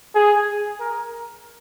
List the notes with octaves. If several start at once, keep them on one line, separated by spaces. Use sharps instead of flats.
G#4
A#4